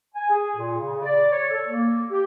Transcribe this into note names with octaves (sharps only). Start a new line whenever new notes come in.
G#5
G#4
A#2
C#3
D5
C#5
A4
A#3
G4